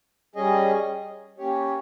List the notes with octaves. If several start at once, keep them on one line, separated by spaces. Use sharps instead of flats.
G3 C#4 G#4 D#5
A#3 C#4 G4 C#5